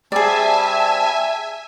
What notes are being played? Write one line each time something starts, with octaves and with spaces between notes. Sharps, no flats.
G3 C4 G#4 D5 E5 G#5 A5